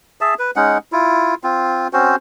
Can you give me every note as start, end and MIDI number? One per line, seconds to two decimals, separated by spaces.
0.21 0.34 68
0.21 0.34 76
0.21 0.34 81
0.39 0.51 71
0.56 0.78 56
0.56 0.78 61
0.56 0.78 63
0.56 0.78 78
0.92 1.35 64
0.92 1.35 65
1.44 1.88 60
1.44 1.88 65
1.93 2.16 60
1.93 2.16 61
1.93 2.16 66
1.93 2.16 72